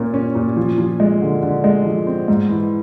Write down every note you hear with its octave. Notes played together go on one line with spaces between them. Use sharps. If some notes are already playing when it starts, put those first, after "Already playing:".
Already playing: A#2 A#3 C#4
C#4
A#2
F3
F3
G#3
D3
D3
G#3
F3
C4
G#2
E3